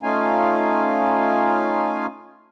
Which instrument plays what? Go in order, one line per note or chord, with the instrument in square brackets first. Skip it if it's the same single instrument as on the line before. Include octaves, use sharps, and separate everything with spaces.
[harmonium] A3 C#4 D#4 F4 F5 G#5